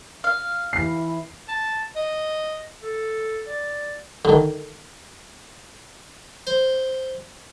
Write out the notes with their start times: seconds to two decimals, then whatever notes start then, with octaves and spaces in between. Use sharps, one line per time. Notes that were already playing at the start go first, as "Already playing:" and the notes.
0.24 F5
0.73 E3 C7
1.48 A5
1.96 D#5
2.82 A4
3.47 D5
4.25 D3 D#3
6.47 C5